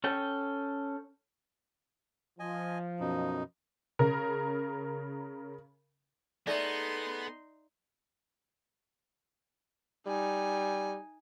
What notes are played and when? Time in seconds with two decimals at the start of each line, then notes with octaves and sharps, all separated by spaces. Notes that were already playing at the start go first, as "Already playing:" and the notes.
0.04 C#4 A4 G5
2.39 F3 D#5 G#5
3.00 F#2 B2 D#4
3.99 C#3 A#4
6.47 A3 B3 D#4 G#4 D5 E5 C6
10.07 G3 D#4 G#5